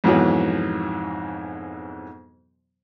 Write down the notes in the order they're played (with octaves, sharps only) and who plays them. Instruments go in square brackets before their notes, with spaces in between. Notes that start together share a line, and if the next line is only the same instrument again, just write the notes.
[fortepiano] F2 G#2 B2 E3 F#3